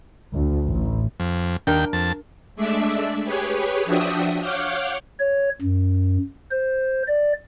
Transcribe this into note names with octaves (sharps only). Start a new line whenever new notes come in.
D2
A1
F2
D#2 D4 A#4 G5
F2 A5
G#3 A3 D4 D5 E5
G4 G#4 B4 C#5
F3 D4 F#4 E5 G5 D#6
C#5 F5 F#5 D6 F6 G6
C#5
F#2
C5
D5